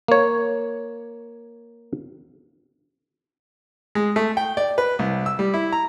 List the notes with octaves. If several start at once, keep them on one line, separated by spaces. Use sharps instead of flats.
A#3 C#5
G#3
A3
G5
D5
B4
C2
E6
G3
E4
A#5